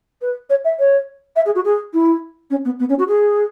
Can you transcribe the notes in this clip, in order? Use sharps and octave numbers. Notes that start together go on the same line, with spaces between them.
B4
C#5
E5
C#5
E5
G#4
F#4
G#4
E4
C#4
B3
B3
C#4
F#4
G#4